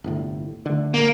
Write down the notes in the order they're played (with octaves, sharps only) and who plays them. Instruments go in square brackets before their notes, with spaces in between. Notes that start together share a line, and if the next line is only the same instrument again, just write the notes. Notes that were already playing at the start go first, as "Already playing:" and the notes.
[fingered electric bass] G1 C2 A2
D3 A3
[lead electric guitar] A#3